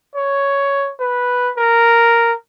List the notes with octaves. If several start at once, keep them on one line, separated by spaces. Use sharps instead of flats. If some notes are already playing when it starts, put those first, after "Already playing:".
C#5
B4
A#4